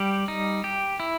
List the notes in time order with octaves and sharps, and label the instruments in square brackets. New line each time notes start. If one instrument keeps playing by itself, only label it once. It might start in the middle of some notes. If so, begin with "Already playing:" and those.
Already playing: [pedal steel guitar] G3 G4
D#4
G4
E4